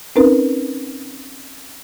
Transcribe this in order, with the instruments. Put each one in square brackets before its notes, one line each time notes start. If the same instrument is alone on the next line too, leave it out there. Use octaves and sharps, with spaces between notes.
[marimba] C4 C#4 D#4 A#4 B4